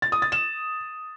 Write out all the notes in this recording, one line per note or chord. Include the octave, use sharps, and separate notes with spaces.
A6
D#6
A6
E7